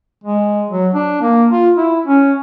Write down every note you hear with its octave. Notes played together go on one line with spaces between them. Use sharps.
G#3
F#3
D4
A#3
F4
E4
C#4